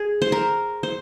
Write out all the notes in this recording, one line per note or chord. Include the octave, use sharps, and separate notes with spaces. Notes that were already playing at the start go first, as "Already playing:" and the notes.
Already playing: G#4
C5
A#4
C5